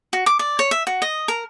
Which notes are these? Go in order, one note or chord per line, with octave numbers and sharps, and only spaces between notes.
F#4
D6
D5
C#5
E5
F#4
D#5
A#4